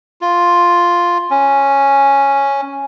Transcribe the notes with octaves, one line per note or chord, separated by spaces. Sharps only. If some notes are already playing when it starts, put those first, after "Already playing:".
F4
C#4